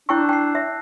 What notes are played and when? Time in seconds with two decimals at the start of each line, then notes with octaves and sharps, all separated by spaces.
0.09 D4 E4 G5 C#6 E6 F#6 G6
0.29 G5 A5 E6 C7
0.55 E5